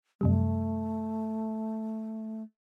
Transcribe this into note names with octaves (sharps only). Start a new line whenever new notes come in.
F#2 C3 G3 A3